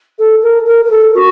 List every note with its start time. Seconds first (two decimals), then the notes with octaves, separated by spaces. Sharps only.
0.19 A4
0.42 A#4
0.66 A#4
0.85 A#4
0.90 A4
1.14 F#4